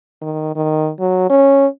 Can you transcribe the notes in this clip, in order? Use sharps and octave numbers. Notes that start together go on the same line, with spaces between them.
D#3
D#3
F#3
C#4